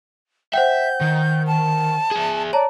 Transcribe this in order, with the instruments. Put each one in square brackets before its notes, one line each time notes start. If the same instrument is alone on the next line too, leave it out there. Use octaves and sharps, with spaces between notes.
[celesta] C5 F#5 G5 [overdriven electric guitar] E5 [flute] G6
[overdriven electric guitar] D#3
[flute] A5
[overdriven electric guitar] G#4 E5
[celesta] C#5 A5 A#5 [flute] D5